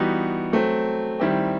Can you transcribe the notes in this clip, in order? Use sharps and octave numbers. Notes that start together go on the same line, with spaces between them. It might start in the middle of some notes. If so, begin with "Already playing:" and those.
Already playing: E3 G3 B3 D#4 F#4
F#3 A3 C4
D#3 G3 C4 E4 G4